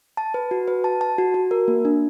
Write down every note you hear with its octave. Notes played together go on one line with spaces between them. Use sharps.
A5
B4
F#4
B4
A5
A5
F#4
F#4
A#4
A#3
D4